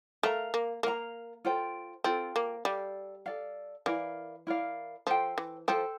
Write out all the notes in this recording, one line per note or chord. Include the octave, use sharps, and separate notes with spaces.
A3 A#4 F5 A#5
A#3
A#3 A#4 F5 A#5
F4 A4 C5 G5
C4 F4 A4 C5 G5
A#3
G3 A4 D5 F5
A4 D5 F5
E3 E4 A#4 D5 F5
E4 A#4 D5 F5
F3 A4 C5 G5
E3
F3 A4 C5 G5